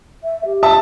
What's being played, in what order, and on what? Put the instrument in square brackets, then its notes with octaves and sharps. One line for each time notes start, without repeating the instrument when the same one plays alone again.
[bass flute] E5
G4
[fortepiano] E5 [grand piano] A5